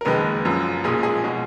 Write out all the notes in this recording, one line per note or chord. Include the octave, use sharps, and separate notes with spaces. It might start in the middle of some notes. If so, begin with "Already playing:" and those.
A#4
F#1 F2 D#3 G#3 B4
F#1 F#2 F3
B1 A#2 F3 G#3 G#4
G#4
B2 G#3